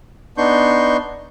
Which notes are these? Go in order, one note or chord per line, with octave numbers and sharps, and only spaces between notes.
B3 D4 D#4 C6 C#6 G6